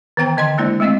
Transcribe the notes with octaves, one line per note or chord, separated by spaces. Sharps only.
D#3 E3 B3 G5 A#5
D3 D#5 G5 C6
G#3 A#3 D4 E4 C5 D5
G#3 A3 C4 D#5 F5